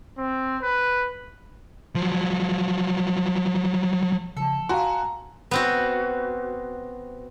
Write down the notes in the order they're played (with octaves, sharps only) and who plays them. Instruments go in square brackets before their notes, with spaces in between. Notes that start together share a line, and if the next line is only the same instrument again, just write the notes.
[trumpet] C4
B4
[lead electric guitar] F3 F#3
[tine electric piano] C#3 F3 [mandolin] A4
[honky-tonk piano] F#4 [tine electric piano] F5 C6 [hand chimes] G#5 A#5
[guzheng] B3 C4 F#4